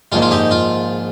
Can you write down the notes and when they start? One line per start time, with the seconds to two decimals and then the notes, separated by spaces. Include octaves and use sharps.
0.12 A#1 G#2 D#3 F4
0.22 F4
0.31 D#4 G4
0.51 F4